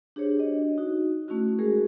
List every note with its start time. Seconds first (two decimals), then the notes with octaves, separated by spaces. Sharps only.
0.16 D4 G4 G#4 C5 C#5
0.39 D4 F#4 D#5
0.78 D#4 F#4
1.28 A3 C#4 E4 F#4
1.59 G#3 F#4 G#4 A#4